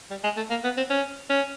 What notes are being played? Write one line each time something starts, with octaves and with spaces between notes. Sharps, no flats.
G3
G#3
A3
A#3
B3
C4
C#4
C#4